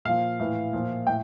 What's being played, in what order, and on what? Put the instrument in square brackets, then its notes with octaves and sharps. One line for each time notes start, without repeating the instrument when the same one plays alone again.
[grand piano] A#2 F3 F5
A2 E3
A#2 F3
A2 G5